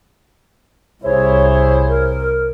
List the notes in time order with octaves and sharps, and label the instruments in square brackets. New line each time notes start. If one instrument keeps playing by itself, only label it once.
[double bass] C2 [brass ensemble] E4 G#4 C5 [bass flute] C#5
[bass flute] A#4